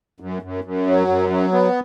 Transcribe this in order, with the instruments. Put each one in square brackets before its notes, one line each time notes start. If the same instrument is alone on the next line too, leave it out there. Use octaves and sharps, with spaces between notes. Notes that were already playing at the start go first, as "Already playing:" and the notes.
[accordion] F#2
F#2
F#2
F#3
F#2
F#3
B3